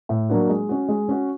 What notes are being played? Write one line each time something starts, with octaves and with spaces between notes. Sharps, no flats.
A2
F#3 A#3 D4 F#4
G#3
C#4 F#4
G#3
C#4 F#4